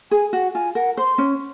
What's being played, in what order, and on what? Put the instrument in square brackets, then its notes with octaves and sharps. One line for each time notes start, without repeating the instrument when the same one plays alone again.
[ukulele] G#4 [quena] G#5
[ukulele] F#4 [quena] F#5
[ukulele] F4 [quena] G#5
[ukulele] A#4 [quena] F#5
[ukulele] C5 [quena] C6
[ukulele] C#4